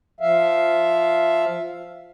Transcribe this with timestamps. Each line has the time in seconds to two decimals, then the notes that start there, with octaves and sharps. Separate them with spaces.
0.21 F3 E5 F5